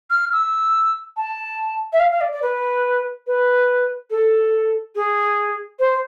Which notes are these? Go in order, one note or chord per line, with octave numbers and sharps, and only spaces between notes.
F6
E6
A5
E5
F5
F5
D5
D5
B4
B4
A4
G#4
C5